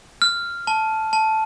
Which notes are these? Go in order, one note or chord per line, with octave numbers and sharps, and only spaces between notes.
F6
A5
A5